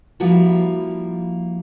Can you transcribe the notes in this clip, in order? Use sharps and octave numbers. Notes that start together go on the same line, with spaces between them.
F3 G3 A#3 E4 F#4